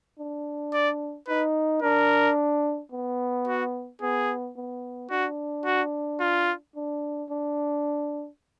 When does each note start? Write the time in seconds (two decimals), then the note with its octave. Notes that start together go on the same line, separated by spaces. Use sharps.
0.18 D4
0.74 D5
1.28 D#4 B4
1.82 D4 A#4
2.92 B3
3.47 F#4
4.02 B3 G#4
4.56 B3
5.10 D4 F#4
5.66 F#4
6.21 F4
6.75 D4
7.29 D4